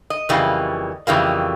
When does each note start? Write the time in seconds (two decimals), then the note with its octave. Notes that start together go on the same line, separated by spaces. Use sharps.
0.10 D#5
0.29 F2 C#3 E3 G3 A#3
1.07 F2 C#3 E3 G3 A#3